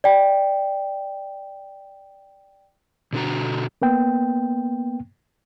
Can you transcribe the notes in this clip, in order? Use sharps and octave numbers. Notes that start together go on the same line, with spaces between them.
D5 G5
B2 D3 F#4 A#5
A#3 B3 G5